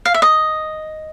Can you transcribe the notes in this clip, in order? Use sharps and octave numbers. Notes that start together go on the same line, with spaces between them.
F5
E5
D#5